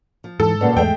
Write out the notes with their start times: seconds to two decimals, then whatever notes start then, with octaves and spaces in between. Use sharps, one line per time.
0.24 F3
0.40 G#2 E3 A4
0.61 G2 A#2 C#3 B4 D5 F#5
0.77 E2 G#2 G#3 A3 E5 G5